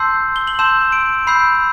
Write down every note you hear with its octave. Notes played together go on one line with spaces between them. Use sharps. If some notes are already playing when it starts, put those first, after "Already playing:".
Already playing: A5 C6 E6 G6 C7
G7
F#7
A5 C6 E6 G6 E7
D7
B5 E6 G6 C7